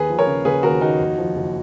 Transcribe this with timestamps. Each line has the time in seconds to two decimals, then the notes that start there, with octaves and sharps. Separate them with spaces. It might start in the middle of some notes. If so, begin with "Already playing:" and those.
Already playing: D#2 G#4 B4
0.10 F3
0.18 A#4 C#5
0.27 C#3
0.45 C#3 G#4 B4
0.63 D#2 F#4 A#4
0.81 D#2 D#4 F#4
0.99 F2
1.18 F3
1.36 F#1